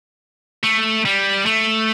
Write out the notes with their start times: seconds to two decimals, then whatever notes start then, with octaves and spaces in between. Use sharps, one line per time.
0.64 A3
1.05 G3
1.46 A3